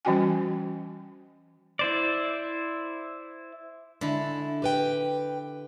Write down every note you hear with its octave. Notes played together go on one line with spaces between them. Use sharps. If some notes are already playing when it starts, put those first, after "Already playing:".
E3 G3 C#4 F#4 G5 G#5
E4 C5 D5
D3 G#3 E4
G4 B4 G5